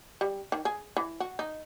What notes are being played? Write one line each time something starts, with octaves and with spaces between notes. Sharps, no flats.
G3
D#3
G#4
E3
F#4
D#4